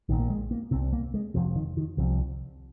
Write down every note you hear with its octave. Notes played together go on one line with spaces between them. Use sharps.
A#1 A#2 D#3
A#3
G#3
A#3
C2 C3 C4
A#3
G#3
F1 F2 C3 F3
D#3
D#3
C2 C3 F3